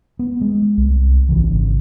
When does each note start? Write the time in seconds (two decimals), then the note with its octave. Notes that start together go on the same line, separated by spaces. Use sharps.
0.19 B3
0.41 G#3
0.77 C2
1.29 G#1 C#3 E3